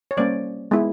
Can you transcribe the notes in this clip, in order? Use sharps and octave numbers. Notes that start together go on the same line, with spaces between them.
C#5
G3 A#3 C#4 C5 D5
G#3 B3 E4